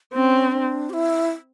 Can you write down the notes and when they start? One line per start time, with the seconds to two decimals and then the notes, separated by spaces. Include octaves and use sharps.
0.14 C4 C#4
0.52 D4
0.90 G4
0.93 E4